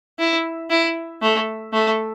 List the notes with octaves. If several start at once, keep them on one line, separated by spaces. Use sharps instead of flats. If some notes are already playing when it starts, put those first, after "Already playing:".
E4
E4
A3
A3